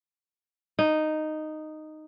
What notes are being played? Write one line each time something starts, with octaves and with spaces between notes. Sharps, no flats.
D#4